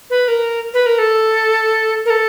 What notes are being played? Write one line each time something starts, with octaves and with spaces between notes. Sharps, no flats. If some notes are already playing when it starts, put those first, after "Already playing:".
B4
A#4
B4
A#4
A4
A#4
A4